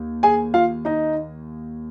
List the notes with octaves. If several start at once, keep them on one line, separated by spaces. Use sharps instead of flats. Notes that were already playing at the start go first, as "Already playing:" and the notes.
Already playing: D#2
G#4 G#5
F4 F5
D#4 D#5